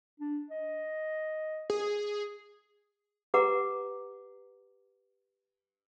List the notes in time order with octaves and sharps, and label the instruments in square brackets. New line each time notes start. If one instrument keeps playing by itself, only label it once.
[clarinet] D4
D#5
[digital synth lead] G#4
[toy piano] G4 B4 F#5 A#5 D6